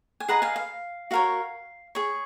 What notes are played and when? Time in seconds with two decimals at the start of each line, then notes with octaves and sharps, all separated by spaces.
0.20 G#5
0.28 G#4 B4 D#5 F#5 A#5
0.42 F5 G#5
0.56 F5
1.11 F#4 A#4 C#5 F5
1.95 G#4 C#5